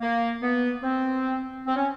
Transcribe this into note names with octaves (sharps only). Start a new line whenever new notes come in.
A#3
B3
C4
C4
C#4